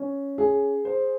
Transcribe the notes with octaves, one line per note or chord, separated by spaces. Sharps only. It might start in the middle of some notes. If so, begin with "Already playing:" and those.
Already playing: C#4
G#4
C5